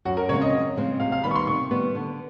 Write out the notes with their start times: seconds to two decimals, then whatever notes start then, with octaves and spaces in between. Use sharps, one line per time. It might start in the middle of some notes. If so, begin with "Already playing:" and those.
0.05 F#2 F#4
0.17 A#4
0.29 C#3 F3 G#3 C4 C#5
0.41 D#5
0.53 F#2
0.76 C#3 F3 G#3 C4
1.00 C3 F5
1.12 F5
1.23 D#3 G3 B3 B5
1.31 C#6
1.35 C6
1.47 C3 C#6
1.71 D#3 G3 B3
1.95 D3